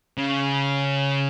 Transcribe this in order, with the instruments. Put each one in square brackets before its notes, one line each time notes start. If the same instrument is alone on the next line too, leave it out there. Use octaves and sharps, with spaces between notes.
[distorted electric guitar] C#3